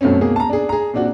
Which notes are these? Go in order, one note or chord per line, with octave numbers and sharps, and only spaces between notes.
F#2 B2 A3 C4 C#4
B2 A#3 G#4
A5 A#5
D4 G#4
G#4 A#5
A#2 C4 D4 F#4